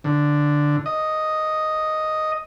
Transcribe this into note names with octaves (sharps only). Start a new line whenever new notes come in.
D3
D#5